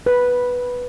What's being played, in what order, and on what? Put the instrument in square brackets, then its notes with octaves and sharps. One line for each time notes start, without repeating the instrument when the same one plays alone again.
[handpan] B4